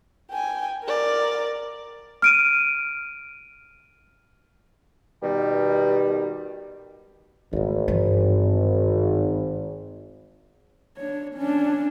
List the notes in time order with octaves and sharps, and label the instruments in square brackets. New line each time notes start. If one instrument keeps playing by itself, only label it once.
[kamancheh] G5 G#5
A#4 D5
[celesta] F6 D7 D#7
[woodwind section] B2 D#3 G3
[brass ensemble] G#1 [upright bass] A3 B3
[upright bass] G2 E3
[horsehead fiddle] D4 C#5
C#4 D4